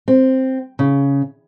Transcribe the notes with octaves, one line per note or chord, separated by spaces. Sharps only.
C4
C#3